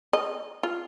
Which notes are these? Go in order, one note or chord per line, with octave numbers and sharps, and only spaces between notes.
D#5
F4